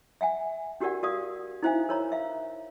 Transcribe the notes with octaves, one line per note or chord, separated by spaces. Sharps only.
E5 F#5 G#5
D4 F#4 G4 A#4 D5 F#5
F#4 A#4 D5 F5 D#6
D#4 E4 C5 E5 F5 G#5
A#4 C#5 A#5
E5 F5